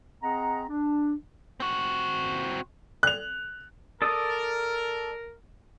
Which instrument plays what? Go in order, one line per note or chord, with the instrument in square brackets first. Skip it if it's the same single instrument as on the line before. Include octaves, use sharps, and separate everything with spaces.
[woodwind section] C4 G#4 D#5 F#5 A#5
D4
[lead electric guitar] C4 F#4
[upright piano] F#6 F7
[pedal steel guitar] A4 D5 D#6 [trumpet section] A#4